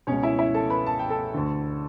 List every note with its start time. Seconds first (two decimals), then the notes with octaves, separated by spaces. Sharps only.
0.07 C#2 B2 C#4 C#5
0.23 E4 E5
0.38 E4 E5
0.54 A4 A5
0.70 B4 B5
0.86 A5
0.99 G5
1.10 A4 A5
1.34 D2 D3